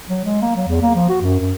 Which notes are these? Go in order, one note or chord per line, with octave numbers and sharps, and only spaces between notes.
F#3
G#3
A#3
F#3
E2
A#3
F3
F#4
F#2
F#2